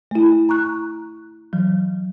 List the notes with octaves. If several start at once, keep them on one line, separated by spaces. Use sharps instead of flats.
A3 E4
A#5 C#6 F#6
E3 F#3